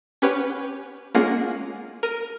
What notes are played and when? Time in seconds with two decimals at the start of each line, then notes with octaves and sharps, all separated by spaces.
0.22 C#4 G4 B4 C#5 F#5
1.14 G#3 A#3 C#4 F4 G#4 F#5
2.03 A#4 D#7